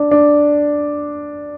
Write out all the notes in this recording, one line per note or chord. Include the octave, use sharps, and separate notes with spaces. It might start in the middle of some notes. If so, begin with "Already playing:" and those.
Already playing: D4
D4